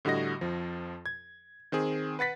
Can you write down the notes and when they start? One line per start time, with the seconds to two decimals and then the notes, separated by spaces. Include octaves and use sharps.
0.05 A2 D3 G3 F#4 D#5 A#6
0.41 F2 F3
1.06 G#6
1.72 D#3 C4 G#4
2.19 B4 F#5 A6 B6